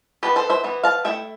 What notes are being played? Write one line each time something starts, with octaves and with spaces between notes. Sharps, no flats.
E3 B3 E4 G4 B4
A4 C5
C5 E5
E3 B3 E4
F5 A5
A3 E4 E5 G5